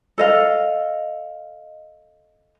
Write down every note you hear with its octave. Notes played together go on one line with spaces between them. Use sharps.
A4 D#5 F5